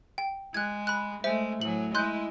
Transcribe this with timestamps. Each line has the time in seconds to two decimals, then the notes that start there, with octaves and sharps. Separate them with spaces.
0.18 G5
0.54 G#3 F#6 G#6
0.87 B5 F#6
1.24 G#3 A3 C5 E5
1.61 A2 F#3 G#4 F#7
1.95 G#3 E4 D#5 C6 F#6 G6